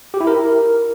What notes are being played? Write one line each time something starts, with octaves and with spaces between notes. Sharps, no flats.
G4
E4
A#4